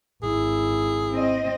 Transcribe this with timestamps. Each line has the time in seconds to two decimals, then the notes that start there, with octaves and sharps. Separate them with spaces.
0.23 G#1 E4 G#4
1.11 C4 D#5